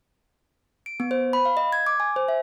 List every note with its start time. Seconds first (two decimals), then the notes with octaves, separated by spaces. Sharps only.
0.86 D7
1.00 B3
1.11 C5
1.33 B5
1.45 F5
1.57 D#5
1.72 G#6
1.86 D6
2.00 G#5
2.16 C5
2.28 E5